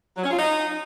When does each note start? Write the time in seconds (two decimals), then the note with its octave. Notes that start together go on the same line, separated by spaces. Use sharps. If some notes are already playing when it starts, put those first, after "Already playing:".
0.16 F#3
0.23 C#4
0.30 F4
0.37 D#4